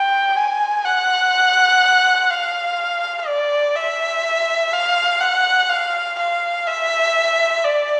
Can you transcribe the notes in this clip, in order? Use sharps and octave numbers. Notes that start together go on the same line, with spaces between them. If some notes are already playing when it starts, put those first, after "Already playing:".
Already playing: G5
G#5
F#5
F5
D5
E5
F5
F#5
F5
F5
E5
D5